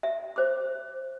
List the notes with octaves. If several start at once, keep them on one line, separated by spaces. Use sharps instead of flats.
E5
C5 D6